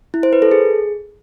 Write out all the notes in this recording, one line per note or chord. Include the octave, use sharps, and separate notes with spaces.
E4
C5
B4
A4
G#4